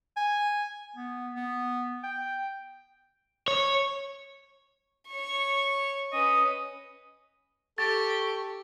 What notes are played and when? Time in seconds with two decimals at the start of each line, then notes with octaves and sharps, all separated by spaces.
0.17 G#5
0.96 B3
1.35 B3
2.03 G5
3.48 C#5
5.10 C#5 C#6
6.13 C#4 B4 D#5
7.78 G4 A4 C#6 A6